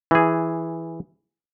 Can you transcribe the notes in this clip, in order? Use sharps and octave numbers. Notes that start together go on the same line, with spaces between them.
E3 G#4